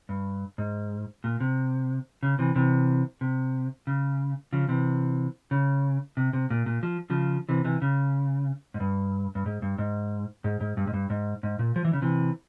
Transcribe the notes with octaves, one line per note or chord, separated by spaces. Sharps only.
G2
G#2
A#2
C3
C#3
C3 E3
C3 E3
C3
C#3
C#3 F3
C3 E3
C#3
C3
C3
A#2
A#2
F3
C#3 F3
C3 E3
C3 E3
C#3
G#2
G2
G2
G#2
G2
G#2
G#2
G#2
G2
G#2
G2
G#2
G#2
A#2
F3
E3
C#3
C3 E3